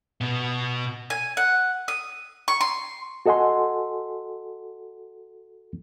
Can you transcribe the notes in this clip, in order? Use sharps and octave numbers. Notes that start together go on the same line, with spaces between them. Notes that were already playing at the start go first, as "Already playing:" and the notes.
B2 B3
G#5
F#5
D#6
C#6
C6
F#4 A4 D#5 F#5 G#5 C6